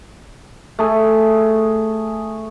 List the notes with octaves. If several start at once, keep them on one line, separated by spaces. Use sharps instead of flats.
A3 G#4